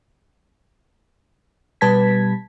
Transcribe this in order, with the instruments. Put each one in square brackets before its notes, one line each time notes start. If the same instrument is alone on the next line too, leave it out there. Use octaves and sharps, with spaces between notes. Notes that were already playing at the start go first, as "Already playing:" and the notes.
[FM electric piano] B2 G3 B4 A5 G#6 B6